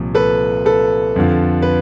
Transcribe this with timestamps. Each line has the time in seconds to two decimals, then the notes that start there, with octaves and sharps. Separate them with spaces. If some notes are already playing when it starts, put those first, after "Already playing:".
Already playing: C2 A#2 F3
0.15 A4 B4
0.66 A4 B4
1.16 F2 D3 F3
1.62 B4